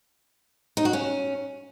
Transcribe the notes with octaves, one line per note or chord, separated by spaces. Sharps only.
D#4
F#4
C#4